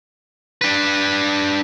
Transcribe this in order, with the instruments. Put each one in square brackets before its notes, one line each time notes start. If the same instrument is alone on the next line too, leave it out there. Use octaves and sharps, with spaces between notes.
[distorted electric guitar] D4 B4